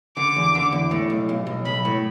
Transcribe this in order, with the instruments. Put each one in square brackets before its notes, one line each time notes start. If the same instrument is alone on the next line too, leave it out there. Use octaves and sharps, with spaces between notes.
[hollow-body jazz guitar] D3 [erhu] D6
[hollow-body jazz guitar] E2
D3
E2
A2
B1
B1
B1
[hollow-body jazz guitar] B1 [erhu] B5
[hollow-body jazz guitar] A2